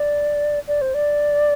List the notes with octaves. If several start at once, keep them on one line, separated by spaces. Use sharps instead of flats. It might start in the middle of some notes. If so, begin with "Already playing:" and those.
Already playing: D5
D5
C5
D5